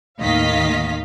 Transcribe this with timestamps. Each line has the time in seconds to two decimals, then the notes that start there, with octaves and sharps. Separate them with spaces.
0.20 D#2 A2 D#3 D#5 F5 B6